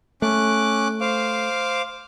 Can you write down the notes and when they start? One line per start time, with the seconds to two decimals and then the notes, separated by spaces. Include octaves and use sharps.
0.22 A3 C#4 D6 F#6
1.01 C5 F5 D6